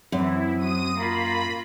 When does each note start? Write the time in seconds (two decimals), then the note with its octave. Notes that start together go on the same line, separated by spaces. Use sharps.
0.12 F#2 E3 C4 E4
0.58 F#3 D#6 D#7
0.97 A#3 F4 A#5 B5